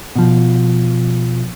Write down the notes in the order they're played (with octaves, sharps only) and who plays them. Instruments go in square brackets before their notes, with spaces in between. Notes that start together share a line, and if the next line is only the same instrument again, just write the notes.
[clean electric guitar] B2 F3